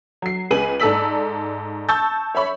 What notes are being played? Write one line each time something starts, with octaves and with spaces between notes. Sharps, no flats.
F#3 C7
C#2 G#4 B4 G#5 D#7 F#7
G#2 A4 D5 E6 B6 F#7
A5 C#6 E6 G6 A6
C#5 E5 B5 C#6